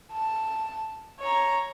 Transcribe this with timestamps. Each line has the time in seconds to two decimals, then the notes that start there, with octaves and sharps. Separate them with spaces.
0.12 A5
1.20 C#5 A#5